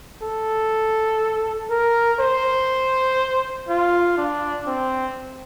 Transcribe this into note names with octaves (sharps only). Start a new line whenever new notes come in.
A4
A#4
C5
F4
D4
C4